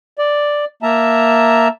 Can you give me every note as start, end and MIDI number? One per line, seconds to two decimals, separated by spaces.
0.18 0.65 74
0.83 1.68 58
0.83 1.68 76
0.83 1.68 81
0.83 1.68 82